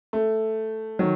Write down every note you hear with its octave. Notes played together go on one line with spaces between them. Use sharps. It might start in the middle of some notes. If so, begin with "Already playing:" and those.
A3
D#3 F#3